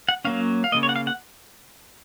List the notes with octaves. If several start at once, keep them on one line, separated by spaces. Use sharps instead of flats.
F#5
F#3 A#3 C#4 F5
F5
C#3 F3 A#3 D#5
C#5
F#5
F5
F#5